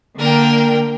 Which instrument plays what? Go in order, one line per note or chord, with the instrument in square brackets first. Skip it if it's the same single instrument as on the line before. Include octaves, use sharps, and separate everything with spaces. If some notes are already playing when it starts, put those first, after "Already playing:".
[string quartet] D3 A#3 A#4 G5